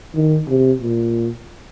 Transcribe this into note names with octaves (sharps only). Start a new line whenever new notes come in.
D#3
C3
A#2